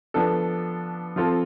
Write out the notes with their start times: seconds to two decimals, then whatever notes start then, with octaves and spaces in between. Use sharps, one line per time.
0.14 F3 B3 D4 A4
1.16 F3 C4 F4 A4